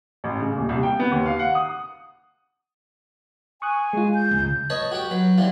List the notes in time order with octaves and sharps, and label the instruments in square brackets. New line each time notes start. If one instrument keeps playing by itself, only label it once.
[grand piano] A1
C#3
D#1
C2
G5
B3
D#2
F5
F#5
D#6
[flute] G#5 [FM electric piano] C#6 D#6 F#6
[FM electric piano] G#3 F4
[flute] G6
[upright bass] C#2
[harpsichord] B4 C#5 D#5 A5
F#4 G4 F#5 G5
F#3 B4
E3 F#3 G3 F4